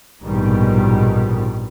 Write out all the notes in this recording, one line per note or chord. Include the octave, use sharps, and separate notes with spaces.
A#1 G#2 B2 D#3 G3